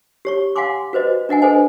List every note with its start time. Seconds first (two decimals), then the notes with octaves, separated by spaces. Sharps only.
0.25 G4 C#5 C#6
0.56 F5 F#5 G#5 C6 D6
0.93 F#4 B4 C5 D#5
1.29 D4 D#5 F#5 G#5
1.42 G#4 A4 B4 C5 D#5 G#5